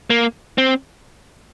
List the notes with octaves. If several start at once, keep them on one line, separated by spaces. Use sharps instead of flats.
A#3
C4